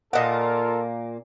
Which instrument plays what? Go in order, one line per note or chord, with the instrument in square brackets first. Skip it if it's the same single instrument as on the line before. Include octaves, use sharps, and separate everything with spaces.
[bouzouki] A#2 A#3 [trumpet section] F4 A4 A#4 [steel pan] D#5 F#5